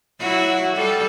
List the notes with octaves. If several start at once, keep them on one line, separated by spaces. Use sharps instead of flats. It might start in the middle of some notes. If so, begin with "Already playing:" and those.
F#3 E4 F#4
G3 A4